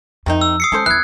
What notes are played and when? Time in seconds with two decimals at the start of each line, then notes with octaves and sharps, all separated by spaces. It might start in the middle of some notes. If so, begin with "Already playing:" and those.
0.26 F2 C3 D#3 D#4
0.41 E6
0.60 D#6 C7 C#7
0.72 G#3 C#4 A4 C5
0.86 E2 E3 C#4 F#6 G#6